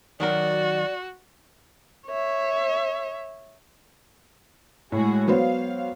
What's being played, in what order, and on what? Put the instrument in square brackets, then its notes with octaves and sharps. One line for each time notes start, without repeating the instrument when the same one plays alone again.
[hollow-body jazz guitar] D#3 F#3 A#4 [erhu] F#4 [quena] D5
[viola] C#5 E5
[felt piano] A2 [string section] G#3 F#4 G#4
[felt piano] F#3 B3 C5 [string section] F5